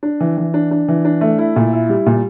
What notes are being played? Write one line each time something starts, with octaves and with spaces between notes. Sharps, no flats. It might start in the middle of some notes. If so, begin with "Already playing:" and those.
D4
E3
E3
D4
D4
E3
D4
A3
E4
A#2
E4
G3
A#2